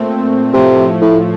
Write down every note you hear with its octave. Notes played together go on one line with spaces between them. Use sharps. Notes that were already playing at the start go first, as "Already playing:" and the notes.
Already playing: A#2 A3 C4
A2 C3 F3 A3
A2